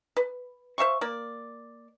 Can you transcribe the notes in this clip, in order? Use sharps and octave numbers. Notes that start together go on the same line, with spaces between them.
B4
C5 E5 F5 C#6
A#3 D5